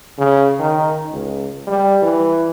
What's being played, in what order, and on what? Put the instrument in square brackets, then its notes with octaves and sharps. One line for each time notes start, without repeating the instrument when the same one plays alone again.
[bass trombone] C#3
D#3
C#2
G3
E3